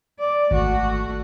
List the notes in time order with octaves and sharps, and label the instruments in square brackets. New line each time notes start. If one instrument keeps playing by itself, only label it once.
[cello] D5
[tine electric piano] G#1 [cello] A3 F#4